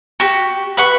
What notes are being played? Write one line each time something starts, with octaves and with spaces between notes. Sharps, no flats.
F#4 G4
B4 F#5 C#6